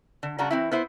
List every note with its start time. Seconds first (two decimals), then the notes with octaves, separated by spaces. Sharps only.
0.23 D3
0.38 G2 C#3 D4 F#4 A#5
0.50 E3 C4 E4
0.71 B3 E4 C5